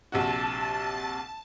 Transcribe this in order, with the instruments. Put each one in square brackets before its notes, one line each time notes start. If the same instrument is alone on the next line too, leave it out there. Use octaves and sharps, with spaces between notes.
[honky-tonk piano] A#1 C3 F#4 [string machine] A5